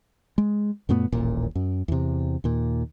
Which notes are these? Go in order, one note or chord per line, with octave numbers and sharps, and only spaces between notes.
G#3
F#2 A#2 A3 B3
D#1 A1 A#2
F#2
E2 C3
D#2 A#2